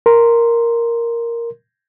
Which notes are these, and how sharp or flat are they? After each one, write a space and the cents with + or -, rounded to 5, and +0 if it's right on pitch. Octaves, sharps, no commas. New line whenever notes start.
A#4 +0 C6 +0